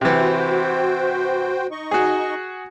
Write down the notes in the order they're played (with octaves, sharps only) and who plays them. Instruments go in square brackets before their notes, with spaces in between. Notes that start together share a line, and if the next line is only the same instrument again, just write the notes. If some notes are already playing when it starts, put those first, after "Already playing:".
[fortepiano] C3 E3 [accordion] F#4 C5 G5
[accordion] D#4 D#5 C#6
[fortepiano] F#4 G#4